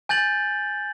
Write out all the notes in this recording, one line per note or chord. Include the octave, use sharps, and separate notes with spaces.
G#5 G6 A6 F#7